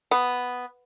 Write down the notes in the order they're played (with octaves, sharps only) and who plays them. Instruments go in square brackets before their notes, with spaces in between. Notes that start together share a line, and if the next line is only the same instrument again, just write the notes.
[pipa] B3